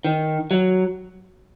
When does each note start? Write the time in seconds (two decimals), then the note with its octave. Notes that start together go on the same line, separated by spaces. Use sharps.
0.05 D#3
0.51 F#3